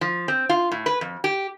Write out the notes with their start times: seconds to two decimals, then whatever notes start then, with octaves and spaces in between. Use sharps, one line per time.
0.01 F3
0.28 C4
0.49 F4
0.71 A2
0.86 B4
1.01 F2
1.24 G4